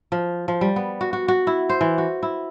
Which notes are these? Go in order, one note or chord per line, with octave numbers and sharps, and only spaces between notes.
F3
F3
G3
B3
F#4
F#4
F#4
E4
C5
E3
F#4
E4